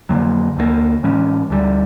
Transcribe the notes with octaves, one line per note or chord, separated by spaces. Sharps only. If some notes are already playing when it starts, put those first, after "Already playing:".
F2 D3 F#3 A#3
D2 D3 F3 A#3
A2 E3 G#3 C#4
D2 D3 G3